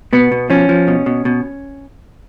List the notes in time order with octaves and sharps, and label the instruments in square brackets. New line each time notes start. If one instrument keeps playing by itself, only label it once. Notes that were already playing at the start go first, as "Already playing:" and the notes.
[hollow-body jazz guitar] B2 B3
B2
F3 C#4
F3
B2
B2
B2